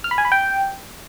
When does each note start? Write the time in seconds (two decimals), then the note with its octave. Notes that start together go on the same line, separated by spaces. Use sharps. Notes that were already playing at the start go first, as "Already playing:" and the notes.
0.04 F6
0.11 B5
0.18 G#5
0.25 B5
0.32 G5